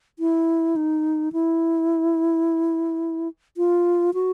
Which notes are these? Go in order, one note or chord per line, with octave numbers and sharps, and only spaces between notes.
E4
D#4
E4
F4
F#4